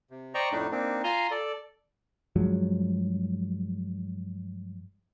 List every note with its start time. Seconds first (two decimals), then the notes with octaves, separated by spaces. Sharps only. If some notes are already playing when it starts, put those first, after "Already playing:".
0.10 C3
0.34 C5 D5 D#5 G5 A#5 C#6
0.52 F2 A2 A3 D4 D#4
0.71 A#3 C4 D4 D#4
1.04 F4 G#5 A#5 C6
1.31 A4 D5
2.36 G2 F3 F#3 G#3